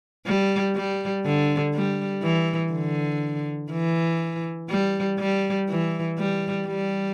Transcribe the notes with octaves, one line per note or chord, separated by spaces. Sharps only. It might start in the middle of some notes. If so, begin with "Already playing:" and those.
G3
G3
D3
G3
E3
D3
E3
G3
G3
E3
G3
G3